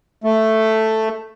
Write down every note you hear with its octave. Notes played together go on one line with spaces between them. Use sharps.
A3